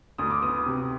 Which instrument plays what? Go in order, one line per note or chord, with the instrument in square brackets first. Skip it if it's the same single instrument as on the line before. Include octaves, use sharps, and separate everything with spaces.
[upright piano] D2 D#6
D6
B3 D#6
C3